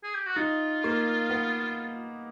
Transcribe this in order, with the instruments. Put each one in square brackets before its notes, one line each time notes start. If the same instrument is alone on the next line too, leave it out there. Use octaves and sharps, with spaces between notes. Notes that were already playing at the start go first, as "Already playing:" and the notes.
[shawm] G#4
G4
F#4
[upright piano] D#4 [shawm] F4
[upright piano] A#3
B3